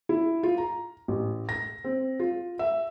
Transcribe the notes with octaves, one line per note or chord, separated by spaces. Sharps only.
E4
F4
A#5
A1
A#6
C4
F4
E5